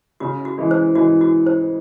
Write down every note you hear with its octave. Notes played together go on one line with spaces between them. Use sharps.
C#3 F#4
F#4
E3 G#3
C5
E3 G#3 F#4
F#4
C5